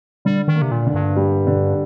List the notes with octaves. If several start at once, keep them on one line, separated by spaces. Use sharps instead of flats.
D3 G3
D#3
A#3
C3
A#2
D3
G2
G3
D3